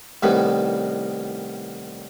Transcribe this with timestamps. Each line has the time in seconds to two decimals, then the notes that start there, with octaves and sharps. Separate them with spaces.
0.23 C2 A2 D#3 G3 B3 B5